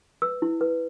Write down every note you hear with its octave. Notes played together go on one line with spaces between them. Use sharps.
B4 E6
E4
B4